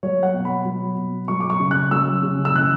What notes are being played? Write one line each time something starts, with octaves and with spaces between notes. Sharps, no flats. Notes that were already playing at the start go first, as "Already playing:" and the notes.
F#3 C#5
F#5
B2
B5
F#3
B2
F#3 C#6
D6
C#6
C#3
F#6
F#3 E6
C#3
E6
E3 F#6